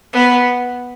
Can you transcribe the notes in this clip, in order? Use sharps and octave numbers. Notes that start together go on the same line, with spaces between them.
B3